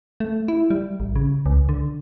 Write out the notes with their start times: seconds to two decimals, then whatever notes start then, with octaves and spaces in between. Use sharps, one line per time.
0.20 A3
0.48 E4
0.70 G3
1.00 A1
1.16 C#3
1.46 C#2
1.69 D3